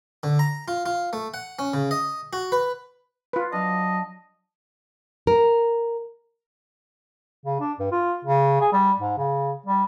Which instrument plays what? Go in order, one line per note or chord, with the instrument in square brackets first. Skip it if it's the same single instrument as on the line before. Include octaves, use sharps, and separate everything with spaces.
[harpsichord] D3
A#5
F4
F4
A3
F#5
C#4
C#3
D#5
F#4
B4
[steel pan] F4 B4
[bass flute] F#3 [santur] D4 F5 [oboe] D#5
[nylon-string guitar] A#4
[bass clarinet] C#3
D4
G2
F4
C#3
G#4
G3
G#2
C#3
G3